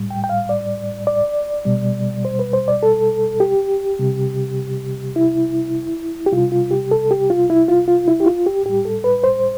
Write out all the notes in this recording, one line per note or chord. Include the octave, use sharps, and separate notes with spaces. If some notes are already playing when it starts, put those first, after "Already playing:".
Already playing: A2 G3
G5
G5
F5
D5
D5
B2 G3
C5
B4
C5
D5
A4
G4
C3 G3
E4
G4
C3 G3 F4
F4
G4
A4
G4
F4
E4
F4
F4
E4
G4
F4
G4
A2 G3 G4
A4
B4
C5